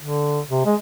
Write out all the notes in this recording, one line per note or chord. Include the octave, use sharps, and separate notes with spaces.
D3
C3
G#3